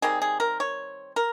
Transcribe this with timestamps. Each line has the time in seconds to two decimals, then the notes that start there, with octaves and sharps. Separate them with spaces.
0.02 D#3 G3 C4 G#4
0.22 G#4
0.40 A#4
0.60 C#5
1.16 A#4